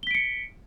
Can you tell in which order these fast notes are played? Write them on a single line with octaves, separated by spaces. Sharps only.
G7 B6 D7 C#7